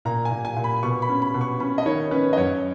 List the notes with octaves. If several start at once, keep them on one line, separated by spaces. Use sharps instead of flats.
A#2 A#5
G#5
A#2
G#5
A#2
B5
B2 C#6
B5
C#4
B5
B2
C#6
C#4 B5
D#5
D#3 C#5
C#4 B4
D#5
F#2 C#5